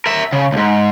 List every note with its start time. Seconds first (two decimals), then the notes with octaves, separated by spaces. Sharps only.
0.06 A#4 E5
0.33 C#3
0.53 C#2 G#2